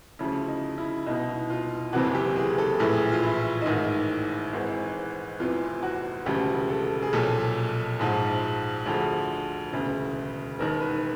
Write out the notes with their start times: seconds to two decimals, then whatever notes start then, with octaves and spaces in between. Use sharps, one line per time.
0.19 D2 C#3 F3 E4
0.48 D#4
0.78 E4
1.06 C2 B2 D#4
1.50 F4
1.93 F#1 F2 C3 E3 F#4
2.15 G4
2.36 G#4
2.58 A4
2.79 A#1 A2 E3 G#4
3.12 F4
3.23 E4
3.62 D#4
3.66 A1 G#2 D#3 E4
4.53 G#1 G#2 E3
5.39 F1 E2 C3 E3 F4
5.83 F#4
6.26 E1 D2 C#3 F3 G4
6.70 A4
7.02 G#4
7.13 B1 A#2 F3 A4
7.99 A#1 G#2 F3
8.86 D2 D3 F3 G#4
9.73 E1 D2 C#3
10.59 E1 D#2 D#3 A#4
10.81 B4